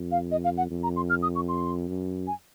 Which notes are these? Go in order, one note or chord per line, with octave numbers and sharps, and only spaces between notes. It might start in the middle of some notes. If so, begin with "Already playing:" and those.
Already playing: F2
F5
D#5
F5
F#5
F2
A#5
C6
F6
D#6
C#6
C6
F#2
G#5